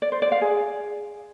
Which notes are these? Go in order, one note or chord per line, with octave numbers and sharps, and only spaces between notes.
D5
C5
D5
F5
G#4